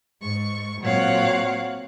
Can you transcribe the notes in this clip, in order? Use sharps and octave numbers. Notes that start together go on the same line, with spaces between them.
G#2 C#6
A#2 F#3 C4 C#5 F5 F#5